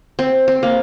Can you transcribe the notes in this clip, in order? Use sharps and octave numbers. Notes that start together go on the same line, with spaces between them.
C4
C4
A#3